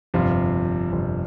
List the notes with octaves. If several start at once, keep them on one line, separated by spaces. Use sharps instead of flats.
G1 F2 C3 F3 F4
G1 F2 C3 F3